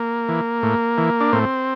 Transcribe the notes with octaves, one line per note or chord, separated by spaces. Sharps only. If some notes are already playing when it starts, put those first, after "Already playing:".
Already playing: A#3
E3
A2
E3
D4
A2 C4